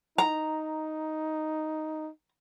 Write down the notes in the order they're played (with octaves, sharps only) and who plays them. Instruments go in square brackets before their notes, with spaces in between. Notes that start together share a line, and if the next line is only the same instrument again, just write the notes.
[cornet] D#4 [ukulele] A#5